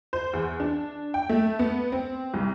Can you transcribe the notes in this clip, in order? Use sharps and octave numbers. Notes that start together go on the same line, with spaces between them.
C5
E2
D4
G5
A3
B3
C4
C2